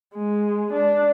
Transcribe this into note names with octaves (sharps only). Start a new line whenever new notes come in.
G#3
D4